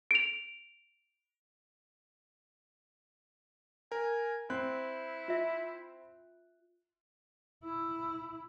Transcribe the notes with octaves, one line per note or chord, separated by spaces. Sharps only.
D7 F7
A#4 G#5
C4 E4 F#6
F4 E5
E4